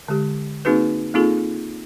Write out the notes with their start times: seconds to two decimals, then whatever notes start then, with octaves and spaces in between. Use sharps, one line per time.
0.08 D3 G#3 G4
0.65 A#3 C4 D#4 F#4 G#4 B4
1.14 A#3 C4 D#4 F4 G#4 A4